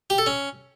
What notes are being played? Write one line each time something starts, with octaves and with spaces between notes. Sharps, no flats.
G4
A4
C#4